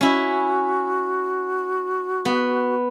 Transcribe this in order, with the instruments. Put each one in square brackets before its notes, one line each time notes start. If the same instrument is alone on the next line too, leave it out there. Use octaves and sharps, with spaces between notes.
[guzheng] C#4 E4 [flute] F#4
[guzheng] B3